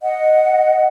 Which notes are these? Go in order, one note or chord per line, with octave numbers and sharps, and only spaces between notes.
D#5 F#5